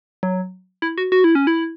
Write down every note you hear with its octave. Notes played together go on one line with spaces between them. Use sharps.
F#3
E4
F#4
F#4
E4
C#4
E4